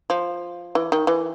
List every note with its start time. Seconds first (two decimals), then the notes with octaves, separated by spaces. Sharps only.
0.10 F3
0.75 E3
0.92 D#3
1.07 E3